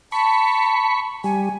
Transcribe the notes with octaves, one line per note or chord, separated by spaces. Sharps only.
A5 B5 C#6
G3 G#5